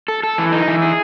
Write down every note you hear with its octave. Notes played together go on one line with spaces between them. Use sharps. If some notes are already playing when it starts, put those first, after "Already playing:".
A4
A4
E3
D#4
E3
G#4